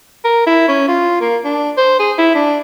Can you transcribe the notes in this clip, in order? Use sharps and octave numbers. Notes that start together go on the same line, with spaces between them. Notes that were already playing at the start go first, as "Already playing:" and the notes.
A#4
E4
C#4
F4
A#3
D4
C5
G#4
E4
D4